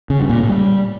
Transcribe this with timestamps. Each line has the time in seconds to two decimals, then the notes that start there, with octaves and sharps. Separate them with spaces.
0.10 C#3
0.20 G2
0.29 A#2
0.39 A2
0.49 G3